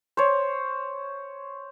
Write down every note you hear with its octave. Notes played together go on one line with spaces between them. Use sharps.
C5 C#5